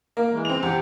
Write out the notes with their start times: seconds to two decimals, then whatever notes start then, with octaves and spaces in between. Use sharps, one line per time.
0.17 A#3
0.31 E3 G#3
0.45 C4 F7
0.63 E2 G4 F#5 G5